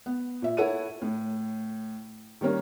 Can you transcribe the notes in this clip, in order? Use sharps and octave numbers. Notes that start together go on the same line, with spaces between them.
B3
A#2 E5
E4 A4 C#5 F#5 D#7
A2
D#3 G3 A#3 C#4 A#4